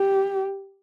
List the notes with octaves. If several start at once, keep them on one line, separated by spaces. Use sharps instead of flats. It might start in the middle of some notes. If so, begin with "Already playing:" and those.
Already playing: G4